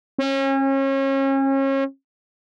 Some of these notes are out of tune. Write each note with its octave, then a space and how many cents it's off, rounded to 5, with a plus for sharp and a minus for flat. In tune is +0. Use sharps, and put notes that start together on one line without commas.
C#4 -35